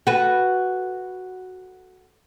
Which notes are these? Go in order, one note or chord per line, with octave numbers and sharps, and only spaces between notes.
F#4 A4 B4